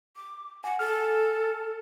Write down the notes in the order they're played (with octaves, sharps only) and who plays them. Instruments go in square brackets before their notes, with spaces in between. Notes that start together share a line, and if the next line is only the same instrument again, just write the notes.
[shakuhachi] D6
[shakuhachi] F#5 [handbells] G#5
[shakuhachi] A4 [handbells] F6